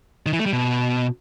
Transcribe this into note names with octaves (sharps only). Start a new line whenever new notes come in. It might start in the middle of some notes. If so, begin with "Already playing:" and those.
D#3
E3
A3
G3
B2